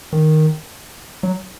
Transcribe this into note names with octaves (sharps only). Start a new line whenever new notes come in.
D#3
F#3